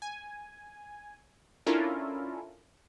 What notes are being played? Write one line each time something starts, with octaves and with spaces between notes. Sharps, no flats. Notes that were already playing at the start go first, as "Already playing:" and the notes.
G#5
C#4 D4 E4 F4 A4 A#4